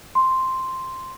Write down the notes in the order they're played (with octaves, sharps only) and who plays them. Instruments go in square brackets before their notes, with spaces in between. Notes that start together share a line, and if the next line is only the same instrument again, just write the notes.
[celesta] C6